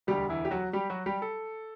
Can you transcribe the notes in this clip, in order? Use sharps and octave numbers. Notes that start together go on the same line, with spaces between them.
E1 D2 D3 G3 G4
E3 E4
G4
F#3 F#4
G3 G4
F#3 F#4
G3 G4
A4